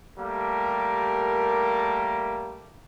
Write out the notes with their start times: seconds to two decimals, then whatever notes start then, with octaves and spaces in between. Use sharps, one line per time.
0.19 G3 A3 A#3 G4 A#4